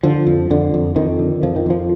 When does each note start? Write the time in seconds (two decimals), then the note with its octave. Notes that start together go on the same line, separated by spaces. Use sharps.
0.03 D3 F3
0.27 F2
0.50 F2 D3
0.74 F2
0.96 F2 D#3
1.19 D3
1.43 F2 F3
1.56 D#3
1.66 F2 F3